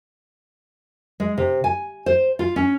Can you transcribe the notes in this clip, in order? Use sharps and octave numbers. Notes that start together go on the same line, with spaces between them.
G#3
C3
G#5
C5
F4
C#4